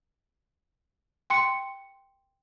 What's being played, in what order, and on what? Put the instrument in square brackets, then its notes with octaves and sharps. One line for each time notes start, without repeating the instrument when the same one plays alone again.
[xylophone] G5 C6 C#7